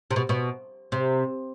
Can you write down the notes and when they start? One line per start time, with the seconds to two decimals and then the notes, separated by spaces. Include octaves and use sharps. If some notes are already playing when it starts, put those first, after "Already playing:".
0.11 C3
0.16 B2
0.29 B2
0.92 C3